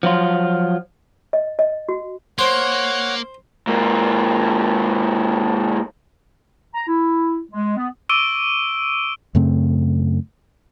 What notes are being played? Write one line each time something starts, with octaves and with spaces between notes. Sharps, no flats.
F3 F#3 F4
D#5
D#5
F#4
A#3 C5 C#5 F#5
G#2 A#3
A#5
E4
G#3
B3
C#6 D6 E6 D7 D#7 G7
F#2 C#3 A3 C4